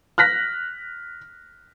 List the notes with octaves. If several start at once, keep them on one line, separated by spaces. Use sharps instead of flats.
F6 F#6 A#6 B6